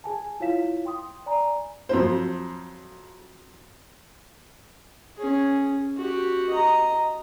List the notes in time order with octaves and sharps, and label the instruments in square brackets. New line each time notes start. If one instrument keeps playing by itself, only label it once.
[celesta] G#4 G#5 A5
E4 F4 C#5 F5 B6 E7
G5 C6 D#6
D5 G#5 A#5 B5
[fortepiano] F2 F#3 C5
[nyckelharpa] C#4 G#4
F#4 G4
D#5 A#5